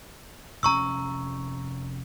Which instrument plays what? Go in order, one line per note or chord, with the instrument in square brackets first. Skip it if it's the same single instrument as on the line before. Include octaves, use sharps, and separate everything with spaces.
[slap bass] F1 F2 C#4 [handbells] A#5 C#6 E6